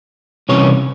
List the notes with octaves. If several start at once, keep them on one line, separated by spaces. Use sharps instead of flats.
C2 C3 E3 C#4 C#5